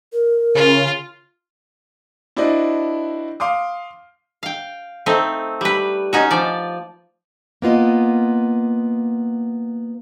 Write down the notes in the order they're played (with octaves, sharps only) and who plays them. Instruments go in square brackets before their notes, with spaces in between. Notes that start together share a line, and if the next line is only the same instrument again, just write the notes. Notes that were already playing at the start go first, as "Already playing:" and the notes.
[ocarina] A#4
[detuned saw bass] C#3 [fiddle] F4
[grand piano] D4 E4 F#4 C5 D5 D#5
F5 C6 D6 D#6
[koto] F5 G5
A3 C4 D#4
G3 B4
C#4 D#4 F#4
F3 D5
[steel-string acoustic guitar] A#3 B3 F4 D#5